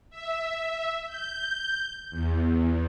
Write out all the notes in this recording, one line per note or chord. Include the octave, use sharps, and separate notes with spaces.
E5
G6
E2